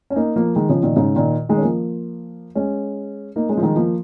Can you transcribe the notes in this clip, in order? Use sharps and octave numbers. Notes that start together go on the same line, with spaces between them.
C#4
A#3 D#4
F3 A#3
D#3 G#3
C#3 F3
A#2 D#3
G#2 C#3
A#2 D#3
D#3 G#3
C#4
F3 A#3
G#3 C#4
A#3 D#4
G#3 C#4
F3
D#3 G#3
F3 A#3